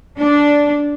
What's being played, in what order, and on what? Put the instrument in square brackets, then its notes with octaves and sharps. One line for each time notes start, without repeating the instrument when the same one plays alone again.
[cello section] D4